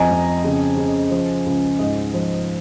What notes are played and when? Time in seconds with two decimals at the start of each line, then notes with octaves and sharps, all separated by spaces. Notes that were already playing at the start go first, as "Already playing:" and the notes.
Already playing: F2 D#5 G#5 A#5
0.10 F2
0.44 C#3
0.77 C#3
1.11 F3
1.46 C#2
1.79 G#2 D#5
2.14 F3